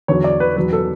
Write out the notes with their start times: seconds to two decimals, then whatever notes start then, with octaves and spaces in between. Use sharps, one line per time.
0.08 E2 D3 F#3 C#5
0.24 D5
0.40 B4
0.56 E2 B2 F#3 B4
0.73 A4